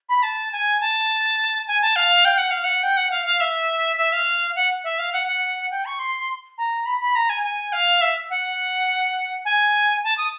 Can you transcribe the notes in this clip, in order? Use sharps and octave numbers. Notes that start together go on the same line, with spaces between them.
B5
A5
G#5
A5
G#5
A5
F5
G5
F#5
F5
F#5
G5
F#5
F5
F5
E5
E5
F5
F#5
E5
F5
F#5
F#5
G5
C#6
C6
A#5
B5
B5
A#5
G#5
G#5
F5
E5
F#5
G#5
A5
D#6